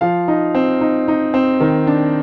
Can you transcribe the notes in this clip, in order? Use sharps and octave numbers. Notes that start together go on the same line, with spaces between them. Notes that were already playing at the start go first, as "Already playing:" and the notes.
F3 F5
D#4
C4
D#4
D#4
C4
D#3
D4